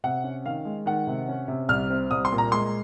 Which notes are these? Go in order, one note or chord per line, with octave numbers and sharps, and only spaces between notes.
C3 F#5
C#4
D#3 F5
G#3
D#3 F#5
C3
C#4
C3
C2 F6
C4
C2 D#6
C6
A#2
A#5
G#3 C6